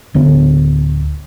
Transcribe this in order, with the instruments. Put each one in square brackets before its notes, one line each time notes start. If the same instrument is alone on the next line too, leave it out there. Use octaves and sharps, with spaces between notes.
[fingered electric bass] D1 D3 B3